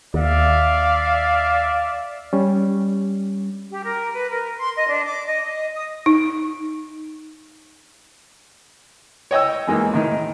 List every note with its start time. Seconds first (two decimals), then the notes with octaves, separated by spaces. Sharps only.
0.14 D#2 D5 E5 F5
2.33 G3 C#4
3.71 G4
3.84 A#4
4.14 B4
4.31 A#4
4.56 C6
4.76 D#5
4.89 D4
5.05 D6
5.27 D#5
5.42 D#5
5.75 D#6
6.06 D#4
9.31 C#5 D#5 G5 E6
9.67 E3 G#3 A#3 D#4
9.94 A2 D#3 D#4